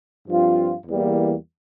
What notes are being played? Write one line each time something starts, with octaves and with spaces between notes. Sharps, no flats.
G2 F3 C4 F4
E2 E3 G3 A#3